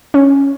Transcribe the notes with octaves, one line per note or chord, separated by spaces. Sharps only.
C#4